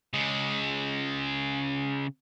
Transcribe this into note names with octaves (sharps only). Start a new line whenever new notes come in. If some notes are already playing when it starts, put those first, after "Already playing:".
C#3 G#3